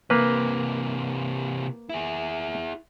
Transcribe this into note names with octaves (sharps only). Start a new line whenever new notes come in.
C3 E3 A#3 B4
E4 G#4